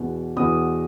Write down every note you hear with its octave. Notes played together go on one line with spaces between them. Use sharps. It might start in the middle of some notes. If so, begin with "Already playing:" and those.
Already playing: E2 B2
E2 B2 D#6